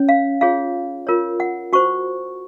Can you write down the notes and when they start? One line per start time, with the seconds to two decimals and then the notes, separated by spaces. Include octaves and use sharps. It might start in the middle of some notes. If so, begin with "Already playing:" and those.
Already playing: C#4 C#5
0.09 F5
0.41 F4 G#4 C#5 F5
1.07 F4 A#4 C#5
1.40 F#5
1.73 F#4 C5 C#6